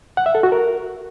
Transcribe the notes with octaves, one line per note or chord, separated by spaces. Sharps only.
F#5
E5
A4
F#4
A#4